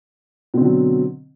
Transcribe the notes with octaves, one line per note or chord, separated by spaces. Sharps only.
B2 D3 F#3 C4